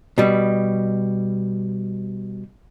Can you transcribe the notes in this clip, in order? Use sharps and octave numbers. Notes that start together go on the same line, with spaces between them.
B2 G3